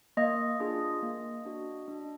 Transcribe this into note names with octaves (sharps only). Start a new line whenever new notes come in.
A#3 D#5
D4 F4 G#4
A#3
D4 F#4
D4